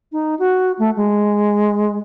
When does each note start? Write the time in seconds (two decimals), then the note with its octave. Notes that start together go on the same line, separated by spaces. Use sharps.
0.12 D#4
0.39 F#4
0.79 A3
0.96 G#3